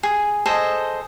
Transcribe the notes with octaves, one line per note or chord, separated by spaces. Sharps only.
G#4
G#4 A4 C5 D#5